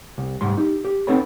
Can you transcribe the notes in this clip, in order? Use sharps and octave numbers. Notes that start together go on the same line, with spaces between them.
C2
C2 G#2 G3 C6
D#4 G4
G4
B3 C4 D#4 A4 C#5 B5